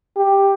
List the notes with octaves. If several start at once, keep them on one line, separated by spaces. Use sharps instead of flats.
G4